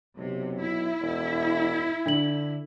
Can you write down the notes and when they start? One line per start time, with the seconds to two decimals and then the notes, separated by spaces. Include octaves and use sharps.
0.18 B1 C3
0.62 E4
1.02 E1
2.06 D3 D4 F#7